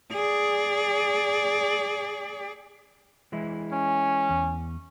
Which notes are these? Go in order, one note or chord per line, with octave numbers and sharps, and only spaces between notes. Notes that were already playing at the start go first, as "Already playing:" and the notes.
G#4 D5
E3 G#3 E4
C#4
E2